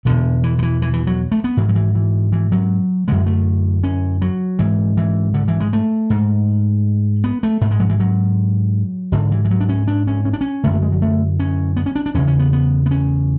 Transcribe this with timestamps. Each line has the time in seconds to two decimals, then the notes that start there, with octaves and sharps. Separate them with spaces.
0.05 E2 B2 D3
0.43 E3
0.59 D3
0.62 E3
0.82 E3
0.93 E3
1.07 F#3
1.32 A3
1.44 B3
1.57 G#2 E3
1.69 F#3
1.75 E3
1.95 E3
2.32 E3
2.52 F#3
3.08 F#2 D3 G#3
3.26 A3
3.84 C#4
4.22 F#3
4.59 G#2 E3
4.97 E3
5.34 D3
5.48 E3
5.60 G#3
5.73 A3
6.10 G#2
7.24 B3
7.43 A3
7.61 G#2 A3
7.71 G#3
7.80 F#3
7.89 E3
8.00 F#3
9.12 G#2 D3
9.31 E3
9.45 E3
9.51 F#3
9.60 D4
9.69 C#4
9.88 D4
10.08 C#4
10.25 C#4
10.33 D4
10.41 C#4
10.63 F#2 D3 A3
10.74 A3
10.82 G#3
10.92 F#3
11.02 A3
11.39 C#4
11.77 B3
11.86 C#4
11.96 D4
12.06 D4
12.14 E2 C#3 C#4
12.27 C#4
12.39 B3
12.53 B3
12.86 B3
12.91 C#4